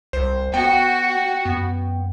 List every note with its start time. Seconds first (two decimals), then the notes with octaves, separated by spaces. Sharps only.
0.13 C2 C5
0.54 B3 F#4 G5
1.45 F#2 B3